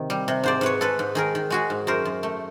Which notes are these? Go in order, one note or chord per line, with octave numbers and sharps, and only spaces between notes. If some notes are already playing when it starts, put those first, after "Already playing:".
Already playing: C3 D#3
G3
C3
G#2 C5 D5
G#2 B4 C#5
G#3 A4 B4
G#2
D#3 G#4 A#4
D#3
G#3 F#4 G#4
G#2
F#2 A#4 C5
F#2
A3